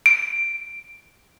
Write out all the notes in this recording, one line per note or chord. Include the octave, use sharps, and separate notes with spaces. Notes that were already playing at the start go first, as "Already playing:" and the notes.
D7